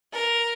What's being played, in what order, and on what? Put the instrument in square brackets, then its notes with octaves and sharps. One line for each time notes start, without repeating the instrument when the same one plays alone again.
[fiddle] A#4